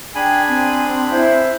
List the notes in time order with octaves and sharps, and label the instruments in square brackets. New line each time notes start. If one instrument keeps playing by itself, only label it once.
[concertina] D4 G#4 B5 [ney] G5 [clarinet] G#5
[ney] C4
[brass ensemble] E4 [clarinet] C5